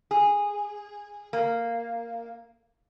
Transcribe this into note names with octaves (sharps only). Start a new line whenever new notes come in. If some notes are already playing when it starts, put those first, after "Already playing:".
G#4
A#3